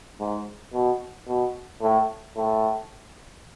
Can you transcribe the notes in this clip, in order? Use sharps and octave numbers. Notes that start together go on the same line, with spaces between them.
G#2
B2
B2
A2
A2